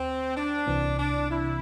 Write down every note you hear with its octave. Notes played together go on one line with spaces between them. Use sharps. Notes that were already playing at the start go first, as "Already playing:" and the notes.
Already playing: D2 C4
D4
C2 C3 E3 C4
D4
E4